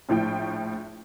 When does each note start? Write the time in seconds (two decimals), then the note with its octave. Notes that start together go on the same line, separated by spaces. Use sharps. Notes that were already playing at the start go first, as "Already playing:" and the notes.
0.09 A#1 A2 F3 G5